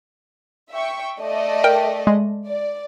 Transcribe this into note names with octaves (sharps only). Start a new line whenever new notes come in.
E5 G5 C#6
A3 D5 D#5
A#4 G5
G#3
D5